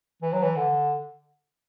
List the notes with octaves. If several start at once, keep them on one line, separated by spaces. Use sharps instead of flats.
E3
F#3
E3
D3